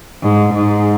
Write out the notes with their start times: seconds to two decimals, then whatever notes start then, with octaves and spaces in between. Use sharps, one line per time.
0.23 G#2
0.54 G#2